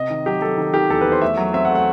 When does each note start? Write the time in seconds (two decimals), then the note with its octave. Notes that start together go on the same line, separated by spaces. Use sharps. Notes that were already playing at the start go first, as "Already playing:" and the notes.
Already playing: C3 D#5
0.10 D#3
0.26 F#3 G4
0.41 F#3 A4
0.57 D#3
0.74 D#3 G4
0.90 E2 A4
1.01 B4
1.06 E2
1.12 C5
1.21 A3 E5
1.37 F#3
1.53 C4 E5
1.65 F#5
1.70 A3
1.75 F#5